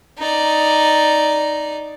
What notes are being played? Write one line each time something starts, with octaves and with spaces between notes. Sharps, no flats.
D#4 D5